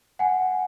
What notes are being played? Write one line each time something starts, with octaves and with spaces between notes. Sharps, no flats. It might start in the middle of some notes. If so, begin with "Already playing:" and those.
F#5 G#5